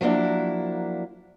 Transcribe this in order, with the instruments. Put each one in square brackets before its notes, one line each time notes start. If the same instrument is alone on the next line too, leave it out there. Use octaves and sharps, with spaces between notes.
[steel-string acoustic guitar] F3 F#3 A#3 D4 E4